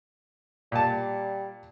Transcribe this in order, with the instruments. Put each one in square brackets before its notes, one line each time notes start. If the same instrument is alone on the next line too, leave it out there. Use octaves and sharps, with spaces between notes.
[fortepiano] A#2 A5 [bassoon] G3